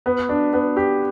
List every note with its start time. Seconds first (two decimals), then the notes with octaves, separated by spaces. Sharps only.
0.06 B3
0.29 D4
0.53 B3
0.77 G4